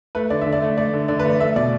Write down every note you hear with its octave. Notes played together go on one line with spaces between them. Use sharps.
A3 B4
D3 D5
D3 E5
D5
A3
A3 D5
D3
D3 D5
B4
A3 D5
A3 E5
B2 D5